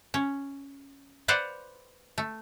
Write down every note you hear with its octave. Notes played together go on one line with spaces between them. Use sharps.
C#4
B4 C5 D5 F5 F#5
A3